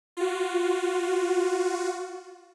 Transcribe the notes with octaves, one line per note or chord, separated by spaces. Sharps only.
F4 F#4